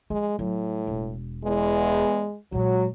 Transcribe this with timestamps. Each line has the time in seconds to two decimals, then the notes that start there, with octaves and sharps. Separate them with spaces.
0.10 F3 G#3
0.39 A2 F#3
0.87 E1
1.44 E2 G#3
2.52 A#2 F#3 G#3